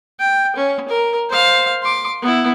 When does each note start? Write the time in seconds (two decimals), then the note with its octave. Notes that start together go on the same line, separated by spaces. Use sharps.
0.20 G5
0.56 C#4
0.89 A#4
1.29 C5 F5
1.83 C6 D6
2.22 B3 E4